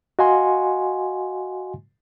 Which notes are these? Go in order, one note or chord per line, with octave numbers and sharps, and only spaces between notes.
F#4 D#5 F5 F#5 G#5 C6